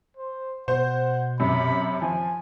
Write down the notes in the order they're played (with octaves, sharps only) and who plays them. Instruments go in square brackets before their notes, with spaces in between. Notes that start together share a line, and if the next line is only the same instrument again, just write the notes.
[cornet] C5
[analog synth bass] B2 [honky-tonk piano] C5 [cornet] F#5
[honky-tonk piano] F#2 C3 [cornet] B5
[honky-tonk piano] F3 [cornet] G#5